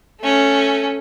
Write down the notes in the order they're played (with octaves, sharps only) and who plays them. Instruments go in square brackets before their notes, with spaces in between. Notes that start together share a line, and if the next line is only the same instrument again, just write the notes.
[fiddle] A3 C#4